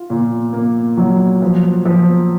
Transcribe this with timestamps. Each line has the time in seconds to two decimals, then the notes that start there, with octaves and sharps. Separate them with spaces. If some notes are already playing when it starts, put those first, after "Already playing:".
Already playing: F4
0.10 A#2
0.53 A#3
0.97 F#3
1.42 F3
1.85 F3